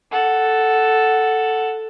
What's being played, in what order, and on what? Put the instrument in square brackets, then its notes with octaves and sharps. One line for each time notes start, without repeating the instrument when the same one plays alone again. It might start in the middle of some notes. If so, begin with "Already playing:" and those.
[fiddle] A4 F#5